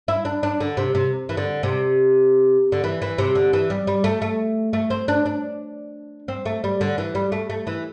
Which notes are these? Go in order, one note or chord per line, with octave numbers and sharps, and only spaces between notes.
E4
D4
D4
D3
C3
C3
E3
D3
C3
D3
E3
E3
C3
D3
E3
G3
G3
A3
A3
A3
C4
D4
D4
C4
A3
G3
D3
E3
G3
A3
A3
E3